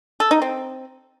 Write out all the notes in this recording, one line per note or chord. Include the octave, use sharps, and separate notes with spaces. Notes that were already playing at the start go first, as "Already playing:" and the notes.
A4
D#4
C4